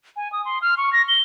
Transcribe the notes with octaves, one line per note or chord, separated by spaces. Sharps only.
G#5
D#6
C6
F6
C#6
A#6
G7